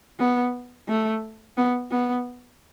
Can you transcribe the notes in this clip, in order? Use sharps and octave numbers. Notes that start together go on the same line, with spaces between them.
B3
A3
B3
B3